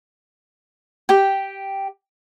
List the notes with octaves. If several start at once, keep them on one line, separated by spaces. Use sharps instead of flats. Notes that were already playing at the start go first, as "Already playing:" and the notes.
G4 G5